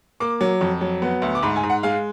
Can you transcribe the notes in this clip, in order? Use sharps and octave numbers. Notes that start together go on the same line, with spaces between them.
A#3 D6
F#3
F2
F#3
B3
D2
D6
G#2 B5
G#5
G#2
F#5
G#3 F5